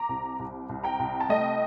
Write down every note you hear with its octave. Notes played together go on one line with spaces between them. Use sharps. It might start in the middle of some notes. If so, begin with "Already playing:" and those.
Already playing: A#5 D6
C2
C2
C2
G5 A#5
C2
A5
A3 D#5 G5